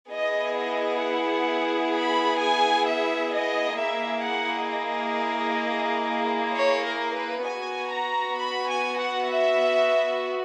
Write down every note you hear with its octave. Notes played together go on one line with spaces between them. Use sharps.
B3 E4 G#4 D#5
D#5
F#5
B5
G#5
E5
D#5
A#3 E4 G#4 E5
F#5
D#5
C#5
A#4
B4
B3 F#4 G#5
A#5
B5
G#5
F#5
E5